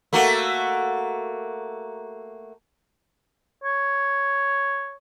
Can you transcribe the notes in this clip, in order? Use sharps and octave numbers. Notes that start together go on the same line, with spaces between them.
A3 A#3 F#4
C#5